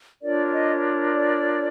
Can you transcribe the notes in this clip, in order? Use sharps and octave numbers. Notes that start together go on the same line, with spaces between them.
D4 F4 A#4 C#5 D5
D#5
D5